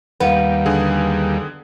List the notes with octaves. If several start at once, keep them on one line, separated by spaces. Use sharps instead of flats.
D#2 G3 B3 B4 F5
D3 G#4